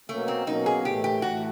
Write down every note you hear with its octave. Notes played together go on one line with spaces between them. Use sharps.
B2 F#3 A3 A#3 C#4
C4
B2 F#3 A#3 C#4 D#4
G#4
A2 E3 A3 G4
G4
A2 E3 A3 F#4